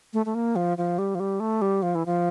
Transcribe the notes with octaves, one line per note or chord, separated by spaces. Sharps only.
A3
A3
A#3
F3
F3
G3
F3
G3
A3
G3
F3
E3
F3